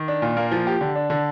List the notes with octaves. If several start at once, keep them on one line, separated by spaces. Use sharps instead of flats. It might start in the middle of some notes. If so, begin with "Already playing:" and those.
Already playing: D#3
D4
A#2
A#3
F3
G4
D3
D4
D3